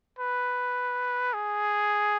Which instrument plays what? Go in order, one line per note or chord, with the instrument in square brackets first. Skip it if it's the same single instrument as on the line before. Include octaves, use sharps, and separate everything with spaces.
[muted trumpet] B4
G#4